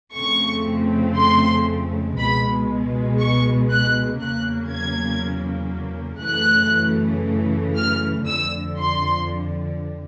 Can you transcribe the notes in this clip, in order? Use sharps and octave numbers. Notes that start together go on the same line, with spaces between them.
F2 C#3 F3 A3 C4 C#6
C6
C#2 B2 G#3 B5
C#6
F#6
E2 C#3 F#3 A#3 F#6
G#6
F#2 C#3 E3 A3 F#6
F6
F2 D3 F3 E6
C6